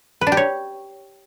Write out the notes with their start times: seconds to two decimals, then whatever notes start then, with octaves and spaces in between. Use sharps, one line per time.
0.21 B4
0.27 D4
0.32 G4
0.37 C#5